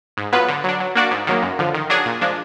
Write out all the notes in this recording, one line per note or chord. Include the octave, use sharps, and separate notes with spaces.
G#2
F#3 B3 F4 B4
D3
F#3 D4
F#3
A#3 D4 F#4 D5
G#2
D#3 F#3 A#3
F#2
D3 F3
D#3
F#3 D4 G#4
A#2
F3 G#3 D4